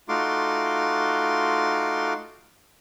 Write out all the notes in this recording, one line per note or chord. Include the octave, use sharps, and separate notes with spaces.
A3 D#4 F4 F#4 C6 D6